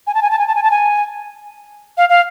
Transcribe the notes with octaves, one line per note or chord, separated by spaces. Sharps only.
G#5
A5
G#5
A5
G#5
A5
G#5
A5
G#5
F5
F5